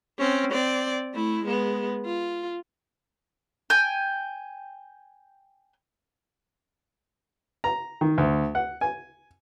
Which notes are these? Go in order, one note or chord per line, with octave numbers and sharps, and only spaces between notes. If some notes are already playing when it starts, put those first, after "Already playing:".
C4 C#4
C4 D5
A3 E4
G#3 B3
F4
G5 G#5
A#5
D#3
D2
F#5
G#5